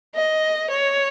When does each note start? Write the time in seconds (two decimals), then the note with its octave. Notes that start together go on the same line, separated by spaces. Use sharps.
0.15 D#5
0.70 C#5